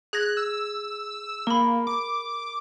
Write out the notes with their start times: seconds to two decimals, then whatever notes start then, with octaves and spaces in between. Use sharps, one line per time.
0.13 G#4 F#6 G#6 A#6
0.37 E6
1.47 A#3 A#4 B5
1.87 D6